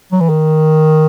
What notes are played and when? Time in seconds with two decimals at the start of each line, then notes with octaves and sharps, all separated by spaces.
0.12 F#3
0.21 E3
0.29 D#3